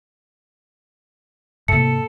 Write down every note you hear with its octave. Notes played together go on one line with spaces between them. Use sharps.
G#2 C3 A#3 A4 C#7